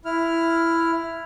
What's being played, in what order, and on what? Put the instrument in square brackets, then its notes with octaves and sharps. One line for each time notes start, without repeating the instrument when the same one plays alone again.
[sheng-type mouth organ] E4 F6